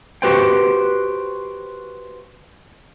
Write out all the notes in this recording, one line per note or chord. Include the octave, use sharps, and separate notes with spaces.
F#4 G4 B4 C5 G5